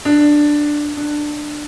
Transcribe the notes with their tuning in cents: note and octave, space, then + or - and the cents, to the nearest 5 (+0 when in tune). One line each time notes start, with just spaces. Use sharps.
D4 +5
D4 +15